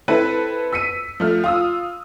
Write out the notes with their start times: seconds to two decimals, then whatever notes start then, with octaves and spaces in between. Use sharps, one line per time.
0.08 C4 E4 A4 B4
0.73 E6 B6 C#7 D#7
1.20 F3 A3 F6
1.44 F4 D#6 E6